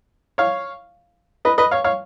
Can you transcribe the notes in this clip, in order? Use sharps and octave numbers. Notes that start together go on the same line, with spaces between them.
C#5 F5
B4 D#5
B4 D#5
C#5 F5
C#5 F5